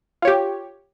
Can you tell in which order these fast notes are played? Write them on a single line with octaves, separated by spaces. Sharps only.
F4 C#5 G4